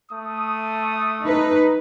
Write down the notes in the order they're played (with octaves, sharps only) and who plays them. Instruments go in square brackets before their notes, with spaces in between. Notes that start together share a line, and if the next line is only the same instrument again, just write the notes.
[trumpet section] A3 D#6
[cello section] D#4 B4